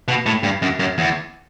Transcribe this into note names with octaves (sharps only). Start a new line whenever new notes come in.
B2
A2
G2
F#2
F#2
E2